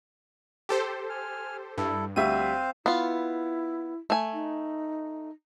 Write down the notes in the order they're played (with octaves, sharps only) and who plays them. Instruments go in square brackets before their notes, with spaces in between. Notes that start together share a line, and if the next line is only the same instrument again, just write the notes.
[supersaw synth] G4 A4 C5
[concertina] G#5 F6
[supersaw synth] G2 [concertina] E4 A4
[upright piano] D2 G3 E5 [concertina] C4 C5 F5 [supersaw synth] D#7
[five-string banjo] B3 F4 [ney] E4
[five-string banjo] A3 G#5
[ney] D#4